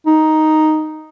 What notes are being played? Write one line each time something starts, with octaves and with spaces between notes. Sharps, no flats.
D#4